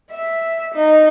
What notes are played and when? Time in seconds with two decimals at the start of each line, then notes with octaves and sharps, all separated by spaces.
0.12 E5
0.75 D#4